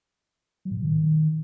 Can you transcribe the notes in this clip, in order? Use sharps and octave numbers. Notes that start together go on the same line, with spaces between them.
F#3
A2
A#2
D#3